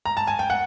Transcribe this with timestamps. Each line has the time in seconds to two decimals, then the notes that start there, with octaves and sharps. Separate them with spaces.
0.05 A#5
0.17 A5
0.27 G#5
0.39 G5
0.50 F#5